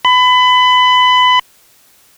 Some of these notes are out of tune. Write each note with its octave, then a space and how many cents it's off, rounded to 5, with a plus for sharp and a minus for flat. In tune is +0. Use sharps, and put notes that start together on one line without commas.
B5 +25